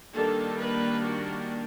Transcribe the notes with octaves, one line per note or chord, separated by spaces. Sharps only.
D#3 G3 A#3 D4 A4
B4
F#4